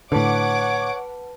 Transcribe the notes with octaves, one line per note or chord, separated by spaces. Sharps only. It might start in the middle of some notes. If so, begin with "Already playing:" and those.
A2 D3 B4 C#5 F#5 A5 D6 B6